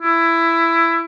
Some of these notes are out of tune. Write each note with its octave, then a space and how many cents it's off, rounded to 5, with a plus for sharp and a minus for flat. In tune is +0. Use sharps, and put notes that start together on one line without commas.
E4 +15